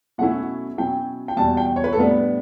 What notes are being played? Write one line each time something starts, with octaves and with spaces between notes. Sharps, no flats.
B2 F#3 A3 C#4 E4 F#5
B2 F#3 C#4 E4 G5
G5
E2 B2 G3 A5
G5
C#5
B4
A4
A2 G3 B3 D4 B4